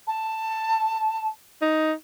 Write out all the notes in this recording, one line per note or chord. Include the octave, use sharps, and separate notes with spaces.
A5
D#4